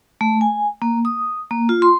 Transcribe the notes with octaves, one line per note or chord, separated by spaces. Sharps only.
A3
G#5
A#3
D#6
A#3
F4
C6